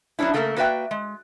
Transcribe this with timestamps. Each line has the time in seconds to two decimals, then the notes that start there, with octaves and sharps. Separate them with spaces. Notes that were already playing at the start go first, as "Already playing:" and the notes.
0.19 F#3 B3 C#4 D4 E4
0.34 C#3 A3 A#3 A#4 E5
0.56 A#3 F#4 B4 D5 E5 G5
0.91 G#3